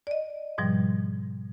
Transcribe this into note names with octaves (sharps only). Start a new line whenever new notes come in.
D5 D#5
G#2 B2 F3 G3